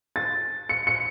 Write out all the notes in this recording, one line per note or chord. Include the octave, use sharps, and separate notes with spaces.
A6
C#7
C#7